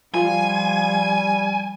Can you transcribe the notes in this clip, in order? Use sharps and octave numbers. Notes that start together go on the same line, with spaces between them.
F3 G3 F4 G#5